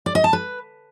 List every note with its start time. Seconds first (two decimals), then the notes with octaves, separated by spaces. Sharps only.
0.06 D5
0.15 D#5
0.24 A5
0.33 B4